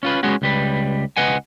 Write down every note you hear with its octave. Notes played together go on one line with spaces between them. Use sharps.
C#4 F4 B4
G#3 B3 C#4 F#4
C#2 G3 B4
C#2 B4 D#5 F#5 G#5